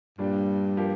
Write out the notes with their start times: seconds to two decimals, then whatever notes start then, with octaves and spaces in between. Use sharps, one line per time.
0.18 G2 A#2 G3 D4
0.77 F3 A#3 G4